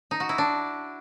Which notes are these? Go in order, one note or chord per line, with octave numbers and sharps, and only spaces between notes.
D#4
F#4
E4
D4